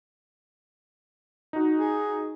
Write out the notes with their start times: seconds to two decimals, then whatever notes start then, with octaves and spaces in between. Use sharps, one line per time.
1.53 D#4 F#4
1.78 G#4